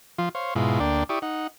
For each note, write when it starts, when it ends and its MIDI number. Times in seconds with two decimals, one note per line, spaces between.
0.18 0.29 53
0.18 0.29 65
0.35 0.54 72
0.35 0.54 73
0.35 0.54 77
0.56 0.80 44
0.56 0.80 47
0.56 0.80 56
0.56 0.80 64
0.56 0.80 65
0.80 1.04 38
0.80 1.04 58
0.80 1.04 62
0.80 1.04 74
0.80 1.04 79
1.09 1.19 64
1.09 1.19 67
1.09 1.19 74
1.09 1.19 85
1.09 1.19 87
1.22 1.47 63
1.22 1.47 78